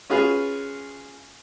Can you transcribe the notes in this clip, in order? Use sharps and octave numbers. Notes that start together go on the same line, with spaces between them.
C#4 F4 F#4 G#4 B4 F5